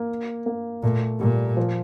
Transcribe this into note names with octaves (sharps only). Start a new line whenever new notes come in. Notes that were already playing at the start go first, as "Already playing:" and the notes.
Already playing: A#3
A#3
A#2 A3
A#2 G3
F3